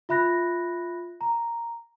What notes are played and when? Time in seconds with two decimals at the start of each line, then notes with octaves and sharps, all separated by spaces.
0.09 F4 E5 B5 F#6 A#6
1.21 A#5